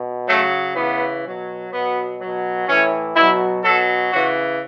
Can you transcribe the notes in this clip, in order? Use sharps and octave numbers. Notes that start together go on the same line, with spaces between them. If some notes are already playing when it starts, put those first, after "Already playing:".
Already playing: B2
C#3 F#3 A3
C#3 E3 B3
B2 F#3
B2 F#3 B3
B2 F#3
A2 E3 C#4
B2 F#3 E4
B2 F#3 A4
C#3 E3 F#4